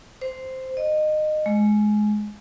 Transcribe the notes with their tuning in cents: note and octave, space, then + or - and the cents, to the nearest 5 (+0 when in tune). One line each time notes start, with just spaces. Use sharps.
C5 -5
D#5 -20
G#3 +20